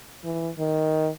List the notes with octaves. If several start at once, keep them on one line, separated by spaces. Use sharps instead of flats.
E3
D#3